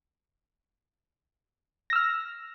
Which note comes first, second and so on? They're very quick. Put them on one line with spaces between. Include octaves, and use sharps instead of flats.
A#6 E6 F6